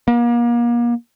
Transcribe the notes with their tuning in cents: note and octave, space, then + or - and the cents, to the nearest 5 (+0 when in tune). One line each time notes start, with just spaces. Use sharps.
A#3 +35